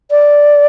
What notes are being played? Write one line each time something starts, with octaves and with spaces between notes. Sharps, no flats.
D5